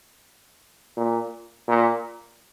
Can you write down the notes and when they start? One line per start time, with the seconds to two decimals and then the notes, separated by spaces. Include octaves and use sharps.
0.97 A#2
1.68 A#2